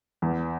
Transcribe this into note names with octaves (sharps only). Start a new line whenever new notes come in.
E2